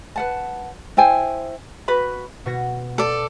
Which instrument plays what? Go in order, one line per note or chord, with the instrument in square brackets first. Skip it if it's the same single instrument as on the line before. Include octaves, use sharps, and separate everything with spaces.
[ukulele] B4 F#5 A5
E4 C5 G5 G#5
F#4 B4 B5
[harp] B2 F#4 A#6
[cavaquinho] A4 D5